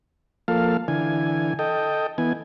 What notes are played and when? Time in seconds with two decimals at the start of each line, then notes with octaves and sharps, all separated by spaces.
0.48 F3 A#3 A4 F5
0.88 D3 E3 G#5
1.59 A4 D#5 G5
2.18 E3 B3 G#5